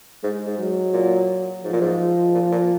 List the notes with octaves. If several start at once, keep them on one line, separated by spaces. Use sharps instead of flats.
G#2 G#3
G#2
F#3
A#2
G#2 F3
A#2
G#2
A#2
A#2